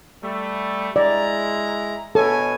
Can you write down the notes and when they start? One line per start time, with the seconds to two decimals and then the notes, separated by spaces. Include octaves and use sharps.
0.22 G3 A3
0.96 G#3 E4 D5 A#5
2.15 B2 A4 C#5 G#5